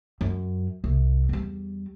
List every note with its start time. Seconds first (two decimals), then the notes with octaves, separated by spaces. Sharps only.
0.21 F#2
0.84 C2
1.29 E2 G3